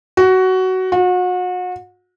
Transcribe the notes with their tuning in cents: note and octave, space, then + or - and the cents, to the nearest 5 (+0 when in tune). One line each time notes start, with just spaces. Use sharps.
F#4 +15
F#4 -35